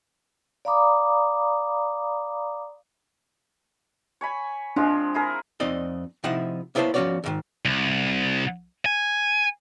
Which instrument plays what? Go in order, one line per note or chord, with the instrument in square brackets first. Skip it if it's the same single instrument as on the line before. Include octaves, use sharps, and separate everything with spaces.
[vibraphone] D5 F5 A#5 B5 D6 D#6
[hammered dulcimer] C#5 G#5 B5
[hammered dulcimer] F3 G#3 C4 [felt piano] D4
[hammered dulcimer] E4 G#4 A#4
[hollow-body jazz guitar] F2 C4 D#4 D5 D#5
C3 F3 D#4 E4 F#5
A#3 B3 E4 C5 C#5 A5
F3 B3 C#4 F#4 C#5 D5
D2 G#2 D#3
[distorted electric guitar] C2
G#5